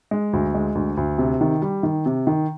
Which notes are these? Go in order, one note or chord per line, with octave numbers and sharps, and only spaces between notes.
G#3
D2
G#3
D2
D2
C3
D#3
G3
D#3
C3
D#3